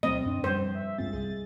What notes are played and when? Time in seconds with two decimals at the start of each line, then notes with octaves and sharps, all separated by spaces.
0.03 D2 B2 F#3 A3 C4 D#5
0.26 F#2 D3 D4
0.44 F#2 F3 G3 B4 C5
0.74 E5
0.98 D1 G2 G#3 C4 F4 G#4 A6
1.13 C2 G#4 D#5